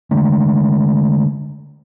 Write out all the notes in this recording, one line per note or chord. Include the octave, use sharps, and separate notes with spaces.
D3 G#3 A3